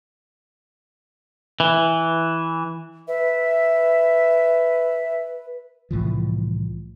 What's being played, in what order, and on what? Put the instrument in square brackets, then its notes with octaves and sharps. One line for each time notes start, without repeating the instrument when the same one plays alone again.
[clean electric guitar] E3
[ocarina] B4 [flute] E5
[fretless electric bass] C2 A2 E3 F3